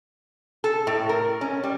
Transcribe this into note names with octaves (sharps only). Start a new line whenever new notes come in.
A4
A2
A#4
C#4
G3